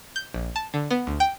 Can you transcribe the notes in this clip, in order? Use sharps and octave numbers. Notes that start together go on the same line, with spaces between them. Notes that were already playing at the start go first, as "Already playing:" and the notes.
G6
A#1
A5
D3
B3
D2
G5